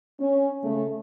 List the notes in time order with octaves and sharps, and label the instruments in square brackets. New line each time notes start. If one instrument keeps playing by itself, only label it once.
[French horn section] C#4
C#3 A3